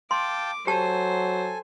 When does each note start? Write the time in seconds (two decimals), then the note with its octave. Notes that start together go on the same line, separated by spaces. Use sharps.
0.11 F5 G5 A5 C6 D6
0.67 F#3 G4 A4 C5 G#5 A5